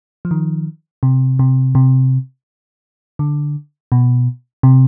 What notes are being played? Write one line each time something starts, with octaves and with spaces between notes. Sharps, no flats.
F3
D#3
C3
C3
C3
D3
B2
C3